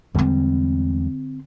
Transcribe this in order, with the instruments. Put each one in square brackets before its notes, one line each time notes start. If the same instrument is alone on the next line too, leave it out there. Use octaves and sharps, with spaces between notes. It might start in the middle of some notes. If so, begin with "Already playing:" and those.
[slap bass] E2 G3 G#3 [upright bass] D3 C4